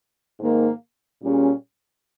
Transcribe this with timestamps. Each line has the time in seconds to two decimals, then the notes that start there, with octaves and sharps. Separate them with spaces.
0.39 G#2 D#3 A#3
1.22 A#2 G3 C#4 G#4